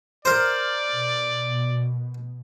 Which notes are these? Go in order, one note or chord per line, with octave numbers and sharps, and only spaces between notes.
A#4 C5 D5
B2